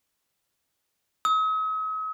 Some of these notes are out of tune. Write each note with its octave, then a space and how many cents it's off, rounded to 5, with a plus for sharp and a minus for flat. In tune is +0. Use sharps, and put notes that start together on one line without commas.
D#6 +45